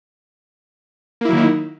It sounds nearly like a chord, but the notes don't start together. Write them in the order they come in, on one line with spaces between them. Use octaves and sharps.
A#3 E4 F#3 D#3 D#4